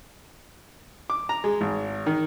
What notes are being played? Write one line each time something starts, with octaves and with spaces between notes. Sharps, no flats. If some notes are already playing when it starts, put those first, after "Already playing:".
D6
A#5
G#3
G#1
D#3